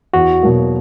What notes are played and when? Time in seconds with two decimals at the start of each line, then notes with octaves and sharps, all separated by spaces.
0.14 E2 F#4
0.43 B2 F#3 A#3